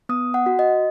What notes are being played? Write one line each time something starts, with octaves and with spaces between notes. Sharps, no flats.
B3 D#6
F#5
F#4
D#5